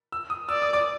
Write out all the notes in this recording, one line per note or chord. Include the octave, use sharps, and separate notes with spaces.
E6
D#6
D5 E6
D#6
D6